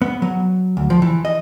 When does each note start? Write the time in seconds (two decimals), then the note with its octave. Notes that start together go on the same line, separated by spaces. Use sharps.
0.02 B3
0.22 F#3
0.77 D2
0.90 F3
1.02 E3
1.25 D#5